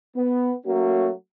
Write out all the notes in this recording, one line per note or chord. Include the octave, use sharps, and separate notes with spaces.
B3
F#3 A3 A#3 C#4 F#4